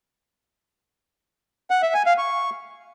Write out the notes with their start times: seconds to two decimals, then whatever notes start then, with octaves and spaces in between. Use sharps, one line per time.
1.70 F#5
1.82 E5
1.94 G#5
2.06 F5
2.18 C#6